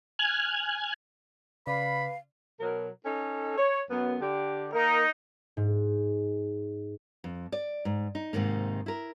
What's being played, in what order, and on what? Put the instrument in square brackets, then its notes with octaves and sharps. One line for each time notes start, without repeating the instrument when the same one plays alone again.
[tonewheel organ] G#5 F6 F#6 G#6
[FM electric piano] C#3 D5 [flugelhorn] B4 [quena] F5 [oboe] B5
[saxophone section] B2 F#3 A#4
C#4 D#4 A4
C#5
F#2 B3
D3 G4
[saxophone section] A#3 A#4 [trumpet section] D#4
[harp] G#2
[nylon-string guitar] F2
D5
G#2
D#4
G#2 C3 D#3 A#3
E4 A#4